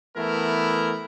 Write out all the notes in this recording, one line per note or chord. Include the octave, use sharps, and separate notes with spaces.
E3 A3 B3 E4 A#4